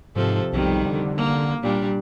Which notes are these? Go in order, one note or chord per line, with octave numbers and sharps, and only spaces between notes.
G#2 C3 F3 A4
B1 F2 D#3 G3
D3
A#3
A#2 G3 D4